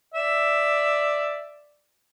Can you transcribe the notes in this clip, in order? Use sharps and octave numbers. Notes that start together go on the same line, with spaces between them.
D5 E5